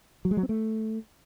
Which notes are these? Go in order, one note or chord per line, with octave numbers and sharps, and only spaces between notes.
F#3
G#3
F#3
C4
A3